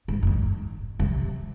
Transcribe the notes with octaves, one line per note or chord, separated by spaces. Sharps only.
G#2
G2
G#2
C3